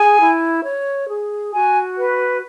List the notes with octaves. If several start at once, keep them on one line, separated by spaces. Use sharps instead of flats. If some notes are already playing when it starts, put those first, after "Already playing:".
Already playing: G#4 G#5
E4
C#5
G#4
F#4 G#5
B4